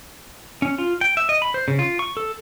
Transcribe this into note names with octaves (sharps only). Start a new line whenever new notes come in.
C#4
F4
G5
E5
D#5
B5
C5
C#3
F4
C#6
A4